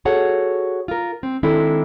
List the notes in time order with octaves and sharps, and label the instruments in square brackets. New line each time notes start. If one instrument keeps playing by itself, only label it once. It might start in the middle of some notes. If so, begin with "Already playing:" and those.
[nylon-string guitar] F#4 G#4 A4 C#5 F#5
F4 A#4
C4
D#3 G#3 C4 D4 E4 A4